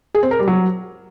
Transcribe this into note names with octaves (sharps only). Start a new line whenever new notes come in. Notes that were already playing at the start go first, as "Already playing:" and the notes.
G#4
C4
A#4
G3
F#3